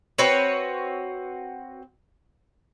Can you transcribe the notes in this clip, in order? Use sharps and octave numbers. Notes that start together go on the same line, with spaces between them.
C4 F#4 B4 C#5